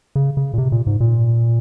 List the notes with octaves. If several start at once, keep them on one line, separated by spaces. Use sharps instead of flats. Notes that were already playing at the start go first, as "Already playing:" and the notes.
C#3
C#3
A#2
C3
A#2
G#2
A#2